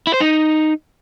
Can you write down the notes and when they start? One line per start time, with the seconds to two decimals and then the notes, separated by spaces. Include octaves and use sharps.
0.07 E4
0.14 C5
0.21 D#4